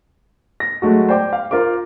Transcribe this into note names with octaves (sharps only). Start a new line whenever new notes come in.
A#6
F#3 G#3 A3 F#4
C5 D5 G5 D6
F5
F4 A#4 C5 D6